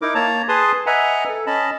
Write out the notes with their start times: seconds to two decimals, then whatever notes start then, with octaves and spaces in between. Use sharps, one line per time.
0.02 D#4 E4 A#4 D6
0.15 A#3 C#5 A5 A#5
0.49 G#4 B4 A5 C6 D#6
0.86 B4 D#5 E5 F#5 G#5 A#5
1.29 A4
1.47 C#4 D#5 A5 B5